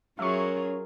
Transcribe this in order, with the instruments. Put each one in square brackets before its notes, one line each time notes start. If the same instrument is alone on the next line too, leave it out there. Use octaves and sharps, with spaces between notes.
[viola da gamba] F#3 F4 G#4 [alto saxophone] C#4 [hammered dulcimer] A#4 [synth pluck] E5 C#6